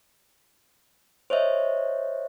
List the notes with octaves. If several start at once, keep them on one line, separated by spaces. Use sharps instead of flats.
C5 C#5 D#5 E5